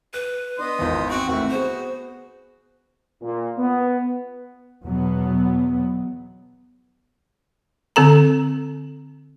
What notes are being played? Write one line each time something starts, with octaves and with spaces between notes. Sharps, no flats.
B4 F#6
B3 D4 D#5 C6
G#1 E2 F4
C4 F#4
G#1 A3 E4 F#4
B3 G#4 C5
A#2
B3
E2 B2 F#3 B3
D3 C4 A4 A#5